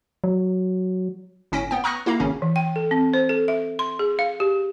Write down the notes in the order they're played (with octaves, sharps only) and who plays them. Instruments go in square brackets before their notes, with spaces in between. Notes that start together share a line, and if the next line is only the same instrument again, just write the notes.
[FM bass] F#3
[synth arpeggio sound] G1 A2 C#4 A#6 B6 D7
B3 G5
A#5 C#6 D#6 F6 F#6 A#6
A#3 E4 F5 A#5
G#1 C#3 C#4
[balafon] E3
G5
A4
C4
C5
A4
E5
C6
G#4
F5
G4